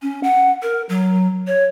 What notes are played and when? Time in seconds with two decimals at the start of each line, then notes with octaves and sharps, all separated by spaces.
0.02 C#4
0.23 F#5
0.62 A#4
0.89 F#3
1.47 C#5